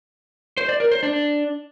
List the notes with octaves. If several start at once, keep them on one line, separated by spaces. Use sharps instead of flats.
C5
D5
A#4
C5
D4